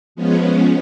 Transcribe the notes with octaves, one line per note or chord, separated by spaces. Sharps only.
F3 G#3 B3 C#4